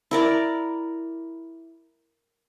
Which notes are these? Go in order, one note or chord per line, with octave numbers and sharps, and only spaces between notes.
E4 A#4 D5